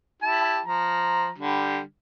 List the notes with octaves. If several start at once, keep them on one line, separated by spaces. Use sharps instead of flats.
E4 G4 A5
F3 A#5
D3 G3